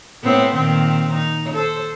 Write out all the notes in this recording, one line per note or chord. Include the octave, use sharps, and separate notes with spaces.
A2 B3 C4
A#2 D#3 C4
D#4
A4 C5